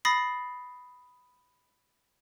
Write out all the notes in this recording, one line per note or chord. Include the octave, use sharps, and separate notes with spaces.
B5 D#6 A6 A#6 C7